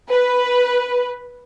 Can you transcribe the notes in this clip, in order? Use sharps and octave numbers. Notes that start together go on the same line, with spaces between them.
B4